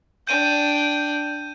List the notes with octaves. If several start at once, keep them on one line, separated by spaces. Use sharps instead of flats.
D4 G5 G6 D#7